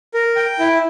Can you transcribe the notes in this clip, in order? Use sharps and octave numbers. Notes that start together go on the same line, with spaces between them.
A#4
G5
E4